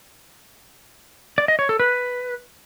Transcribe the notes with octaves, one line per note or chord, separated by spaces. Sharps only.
D5
D#5
C#5
A4
B4